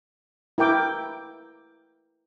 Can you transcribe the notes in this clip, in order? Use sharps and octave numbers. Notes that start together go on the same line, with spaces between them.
E4 A#4 G5 D6